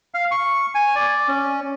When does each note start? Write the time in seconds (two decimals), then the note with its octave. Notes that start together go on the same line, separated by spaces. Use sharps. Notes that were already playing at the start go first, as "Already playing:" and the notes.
0.14 F5
0.31 C#6
0.75 G#5
0.95 D5
1.28 C#4